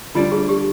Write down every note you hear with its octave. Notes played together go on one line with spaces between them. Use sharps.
D2 D3 G3 D4 F4
G#4
G4